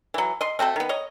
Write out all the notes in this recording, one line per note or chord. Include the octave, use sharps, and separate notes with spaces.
E3 F#3
D#5 C6
A3 C4 F#4 A4
D#3 B3
C#5 D#5